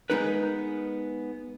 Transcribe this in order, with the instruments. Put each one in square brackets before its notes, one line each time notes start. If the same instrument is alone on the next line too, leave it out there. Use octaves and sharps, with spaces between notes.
[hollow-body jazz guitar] G#3 B3 C4 D#4 A#4 B4